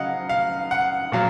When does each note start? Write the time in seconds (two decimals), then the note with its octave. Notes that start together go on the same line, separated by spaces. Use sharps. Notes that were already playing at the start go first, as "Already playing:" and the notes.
Already playing: C#3 F#3 D#5 F5 F#5
0.29 F5
0.71 F#5
1.12 A#2 F#3 F5